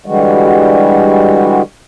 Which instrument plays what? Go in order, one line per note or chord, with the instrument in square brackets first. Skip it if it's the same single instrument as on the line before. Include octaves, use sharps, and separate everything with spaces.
[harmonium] D3 E3 G3 G#3 F#4